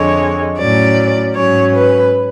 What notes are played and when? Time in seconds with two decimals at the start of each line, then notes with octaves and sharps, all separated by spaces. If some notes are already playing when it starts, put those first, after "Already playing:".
Already playing: F2 D3 G#3 C#5
0.57 A2 F#3 C#4 D5
1.36 G#2 F#3 C#4 C#5
1.75 B4